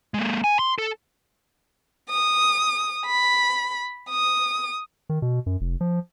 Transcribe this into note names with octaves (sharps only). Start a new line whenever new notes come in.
G#3 A#3
G#5
C6
A4
D#6
B5
D#6
D#3
B2
F#2
F1
F3